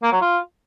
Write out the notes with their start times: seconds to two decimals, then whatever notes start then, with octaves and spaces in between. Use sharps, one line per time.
0.02 A#3
0.12 F#3
0.21 F4